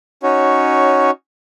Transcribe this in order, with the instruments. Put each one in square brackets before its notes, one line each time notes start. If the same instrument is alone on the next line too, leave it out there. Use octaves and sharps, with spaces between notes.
[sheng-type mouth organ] C#4 D#4 F#4 C#5